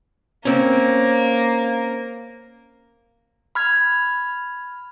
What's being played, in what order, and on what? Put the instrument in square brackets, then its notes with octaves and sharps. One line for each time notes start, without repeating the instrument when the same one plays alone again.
[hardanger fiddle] A#3 [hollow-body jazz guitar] C4 C#4
[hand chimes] B5 F6 G#6